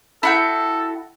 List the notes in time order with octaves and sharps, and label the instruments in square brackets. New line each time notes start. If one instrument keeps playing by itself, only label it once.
[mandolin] E4 F#4 G5 [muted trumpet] A4